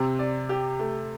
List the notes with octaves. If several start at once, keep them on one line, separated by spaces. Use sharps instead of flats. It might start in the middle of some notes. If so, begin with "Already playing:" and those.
Already playing: C3 C4
D5
G4
A3